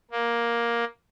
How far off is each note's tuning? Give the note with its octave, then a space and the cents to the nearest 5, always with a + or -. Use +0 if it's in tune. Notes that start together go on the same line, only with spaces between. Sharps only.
A#3 +10